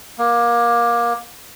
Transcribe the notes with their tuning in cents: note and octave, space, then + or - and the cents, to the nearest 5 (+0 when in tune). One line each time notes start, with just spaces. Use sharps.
A#3 +20